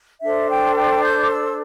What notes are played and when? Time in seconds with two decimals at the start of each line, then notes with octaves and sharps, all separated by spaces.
0.22 D4 A4 C5 E5
0.49 G5
0.76 G5
1.04 G6
1.20 D6
1.30 E6